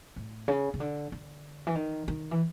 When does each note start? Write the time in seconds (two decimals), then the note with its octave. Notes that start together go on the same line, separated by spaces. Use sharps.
0.16 A2
0.48 C#3
0.74 C#3
0.80 D3
1.12 D3
1.67 E3
1.75 D#3
2.08 D#3
2.31 E3